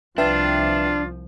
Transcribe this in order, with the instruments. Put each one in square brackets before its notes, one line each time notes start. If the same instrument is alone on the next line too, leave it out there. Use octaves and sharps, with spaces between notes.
[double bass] C2 F3 [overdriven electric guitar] D4 [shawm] F4 [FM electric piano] B4 E5 G5